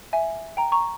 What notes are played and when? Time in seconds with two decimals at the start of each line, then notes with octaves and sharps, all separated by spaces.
0.13 E5 G#5
0.57 G5 A#5
0.72 A#5 C#6